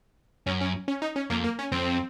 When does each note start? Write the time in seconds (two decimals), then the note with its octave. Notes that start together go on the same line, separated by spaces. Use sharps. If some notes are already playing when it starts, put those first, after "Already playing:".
0.46 F#2 C#4
0.61 C#4
0.88 C#4
1.02 D#4
1.16 C#4
1.30 F2 A#3
1.44 A#3
1.59 C#4
1.72 F2 C4